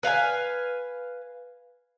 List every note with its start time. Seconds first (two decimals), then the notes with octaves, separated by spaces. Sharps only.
0.03 B4 F5 F#5 G#5